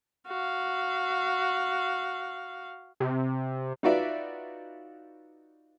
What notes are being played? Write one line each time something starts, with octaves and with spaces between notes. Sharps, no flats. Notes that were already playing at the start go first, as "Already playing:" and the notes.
F#4 F5
C3
D#4 F4 F#4 B4 D5 E5